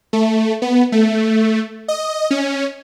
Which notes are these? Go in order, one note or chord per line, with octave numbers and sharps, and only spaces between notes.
A3
B3
A3
D#5
C#4